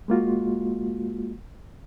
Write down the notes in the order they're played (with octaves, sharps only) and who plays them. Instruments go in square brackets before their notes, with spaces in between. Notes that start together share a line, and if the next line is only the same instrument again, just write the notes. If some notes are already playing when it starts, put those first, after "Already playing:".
[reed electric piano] G#3 A#3 F4 F#4